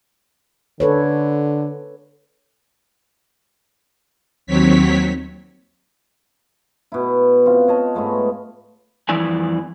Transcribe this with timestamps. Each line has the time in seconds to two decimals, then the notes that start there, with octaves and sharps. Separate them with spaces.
0.80 D3 A4 B4 C#5
4.47 D#2 F#3 C4 C#5 B6
6.92 B2 E4
7.46 C4 F4
7.68 C#5 D#5 A5
7.95 G#2 G#3 A3 B3
9.09 F2 E3 G3 E4 D5 G#5